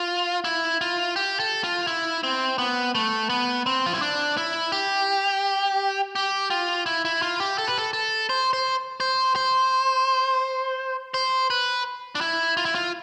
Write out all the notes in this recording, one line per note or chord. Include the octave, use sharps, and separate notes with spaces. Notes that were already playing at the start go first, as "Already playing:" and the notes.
Already playing: F4
E4
F4
G4
A4
F4
E4
C4
B3
A3
B3
C4
F4
E4
D4
E4
G4
G4
F4
E4
E4
F4
G4
A4
B4
A4
A4
C5
C5
C5
C5
C5
B4
D4
E4
F4
E4
F4